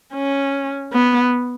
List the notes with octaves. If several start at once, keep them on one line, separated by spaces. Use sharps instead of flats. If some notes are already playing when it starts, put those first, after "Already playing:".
C#4
B3